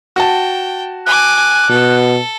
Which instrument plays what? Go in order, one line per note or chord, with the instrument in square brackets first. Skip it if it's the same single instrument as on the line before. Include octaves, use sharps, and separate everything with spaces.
[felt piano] F#4 A5 [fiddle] G5
[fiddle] G#5 D6 [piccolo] F#6
[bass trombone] B2 [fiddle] A4